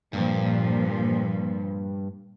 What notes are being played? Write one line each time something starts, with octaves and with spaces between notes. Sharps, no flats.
G2 A#2 F3